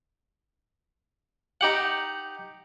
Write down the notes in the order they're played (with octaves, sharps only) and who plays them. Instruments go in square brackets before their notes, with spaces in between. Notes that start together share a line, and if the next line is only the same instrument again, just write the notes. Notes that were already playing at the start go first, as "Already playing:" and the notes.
[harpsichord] D#4 G4 F#5